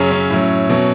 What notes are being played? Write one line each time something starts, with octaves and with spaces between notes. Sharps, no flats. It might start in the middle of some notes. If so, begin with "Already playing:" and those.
Already playing: F#2 C#3 F#3 C#4
C#4
A2 F#3
B2 F#3